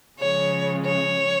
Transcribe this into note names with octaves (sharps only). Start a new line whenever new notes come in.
C#3 F3 G#3 C#5
C#5